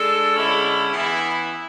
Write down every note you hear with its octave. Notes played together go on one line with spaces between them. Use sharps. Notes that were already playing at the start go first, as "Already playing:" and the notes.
Already playing: G#3 D4 A4
D3 G#3 C#4 E4
E3 B3 E4